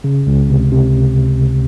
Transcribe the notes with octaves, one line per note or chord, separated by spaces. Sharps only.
C#3
C#2
C3
C3